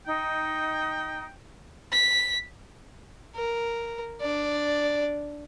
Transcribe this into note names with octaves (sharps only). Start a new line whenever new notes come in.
D#4 G5
B6
A#4
D4 D5